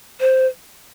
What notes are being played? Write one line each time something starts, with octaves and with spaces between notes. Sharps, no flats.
C5